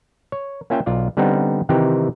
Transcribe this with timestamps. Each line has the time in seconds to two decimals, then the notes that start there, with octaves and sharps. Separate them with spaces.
0.32 C#5
0.70 A#3 C#4 F4 E5 G5
0.86 B1 F4 D5
1.17 D3 G3 B3 C4 D#4
1.69 C3 D#3 E3 C4 D#4 G4